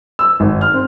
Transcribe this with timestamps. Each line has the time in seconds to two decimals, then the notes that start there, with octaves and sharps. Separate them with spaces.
0.19 E6
0.40 G#1
0.61 F6
0.73 C4